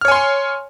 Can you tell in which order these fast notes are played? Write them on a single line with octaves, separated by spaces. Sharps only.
F6 C#5 G#5 C6